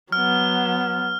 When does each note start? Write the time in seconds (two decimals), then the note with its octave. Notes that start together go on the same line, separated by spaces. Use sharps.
0.12 F#3 B3 F6